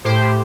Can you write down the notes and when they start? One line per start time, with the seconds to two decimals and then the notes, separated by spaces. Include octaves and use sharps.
0.04 A2 G4 C5
0.21 A2